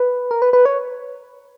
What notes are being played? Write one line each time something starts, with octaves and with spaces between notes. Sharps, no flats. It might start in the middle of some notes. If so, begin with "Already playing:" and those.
Already playing: B4
A#4
B4
B4
C#5